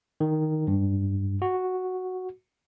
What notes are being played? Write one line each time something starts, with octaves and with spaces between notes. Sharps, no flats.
D#3
G2
F#4